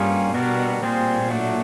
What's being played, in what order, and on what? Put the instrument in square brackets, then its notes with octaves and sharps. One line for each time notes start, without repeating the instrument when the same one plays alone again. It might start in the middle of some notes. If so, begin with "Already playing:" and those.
Already playing: [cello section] G2 [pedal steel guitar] G3 A#3 C#4 F4 G#4
[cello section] B2 [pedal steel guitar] G3 B3 D4 F#4 A#4
[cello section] A#2 [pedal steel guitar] G3 C4 F4 G#4 C5
[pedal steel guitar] F#3 A3 D4 F#4